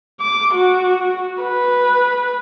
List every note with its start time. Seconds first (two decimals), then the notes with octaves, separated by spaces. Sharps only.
0.21 D6
0.54 F#4
1.42 B4